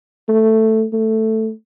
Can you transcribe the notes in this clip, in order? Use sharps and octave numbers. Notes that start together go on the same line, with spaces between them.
A3
A3